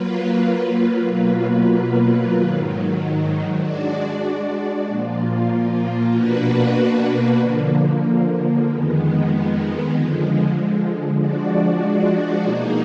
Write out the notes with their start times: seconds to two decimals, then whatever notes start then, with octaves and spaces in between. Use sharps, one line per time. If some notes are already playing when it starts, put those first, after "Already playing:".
Already playing: F#3 A#3 F4 B4
1.07 B2 F#3 A#3 F4 B4
2.34 G#2 D#3 F#3
3.60 G#3 D4 F#4 D5
4.86 A#2 F3 A#3 F4
6.13 B2 A#3 D4 F#4 B4
7.38 D3 F3 A#3
8.65 F2 D#3 G#3 B3
9.92 D3 F3 G#3
11.18 F3 G#3 D4 F#4 D5
12.43 B2 A#3 D#4 G#4